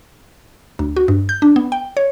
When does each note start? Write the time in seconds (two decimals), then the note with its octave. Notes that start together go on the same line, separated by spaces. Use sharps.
0.79 D2
0.97 F#4
1.08 G2
1.29 G6
1.42 D4
1.56 B3
1.72 G5
1.97 C#5